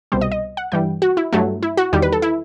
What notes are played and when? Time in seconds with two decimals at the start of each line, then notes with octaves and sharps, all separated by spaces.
0.12 C2 B2 G3 C5
0.21 D#5
0.32 D#5
0.57 F#5
0.72 G2 E3 G3 G5
1.02 F#4
1.17 E4
1.33 G2 F#3 A3
1.63 E4
1.77 F#4
1.93 E2 D#3 G3 G4
2.02 B4
2.12 A4
2.22 E4